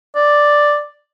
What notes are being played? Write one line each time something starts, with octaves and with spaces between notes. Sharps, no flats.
D5